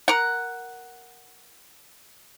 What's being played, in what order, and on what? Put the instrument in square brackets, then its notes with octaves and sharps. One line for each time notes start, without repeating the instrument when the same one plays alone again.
[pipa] A#4 F#5